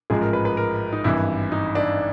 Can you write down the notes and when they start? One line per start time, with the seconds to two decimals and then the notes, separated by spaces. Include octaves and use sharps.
0.10 A1 G#2 F3 G#3 G#4
0.21 A#4
0.33 B4
0.45 B4
0.57 A#4
0.93 D#4
1.04 G#1 G2 E3 E4
1.52 D#4
1.75 D4